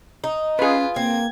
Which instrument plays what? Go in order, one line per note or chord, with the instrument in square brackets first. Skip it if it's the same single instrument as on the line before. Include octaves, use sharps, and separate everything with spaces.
[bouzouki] D#4
[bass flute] C#4 [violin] F4 [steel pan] G#4 B4
[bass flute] A#3 [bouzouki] C4 [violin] G#6